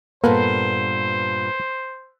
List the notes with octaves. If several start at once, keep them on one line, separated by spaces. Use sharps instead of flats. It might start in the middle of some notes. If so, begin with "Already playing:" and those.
G2 A#2 A#3 B3 A4 B4 C5